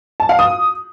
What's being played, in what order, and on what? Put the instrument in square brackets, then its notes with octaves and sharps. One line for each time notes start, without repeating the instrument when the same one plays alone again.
[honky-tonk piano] A5
F5
D#6